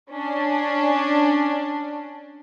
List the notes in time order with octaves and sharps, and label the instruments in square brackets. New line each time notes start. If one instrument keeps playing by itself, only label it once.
[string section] C#4 D4